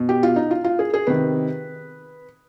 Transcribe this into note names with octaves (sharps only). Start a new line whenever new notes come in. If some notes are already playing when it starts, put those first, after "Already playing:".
Already playing: B2
G4
F4
D#4
F4
F4
G#4
G#4
C3 D#3 B4